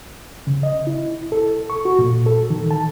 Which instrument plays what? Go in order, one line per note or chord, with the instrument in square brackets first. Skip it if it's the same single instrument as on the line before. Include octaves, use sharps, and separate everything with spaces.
[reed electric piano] C#3
D#5
E4
A4
C#6
F#4
A#2
A4
D#3
A5